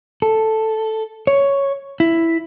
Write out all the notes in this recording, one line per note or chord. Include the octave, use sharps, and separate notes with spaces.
A4
C#5
E4